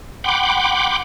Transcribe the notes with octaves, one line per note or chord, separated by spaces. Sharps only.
F#5 G5 B5 C6 D6